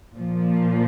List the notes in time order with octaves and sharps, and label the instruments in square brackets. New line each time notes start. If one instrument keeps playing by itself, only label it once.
[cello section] A#2 F3